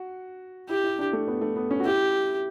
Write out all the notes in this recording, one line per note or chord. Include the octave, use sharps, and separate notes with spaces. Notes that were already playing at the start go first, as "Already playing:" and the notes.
Already playing: F#4
E4 G4
E4
D4
A3
B3
A3
B3
C#4
F#4
E4 G4